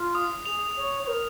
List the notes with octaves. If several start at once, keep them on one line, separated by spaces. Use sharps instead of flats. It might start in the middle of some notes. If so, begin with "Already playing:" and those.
Already playing: F4
D#6
G#4 F7
C#5
C#5
A#4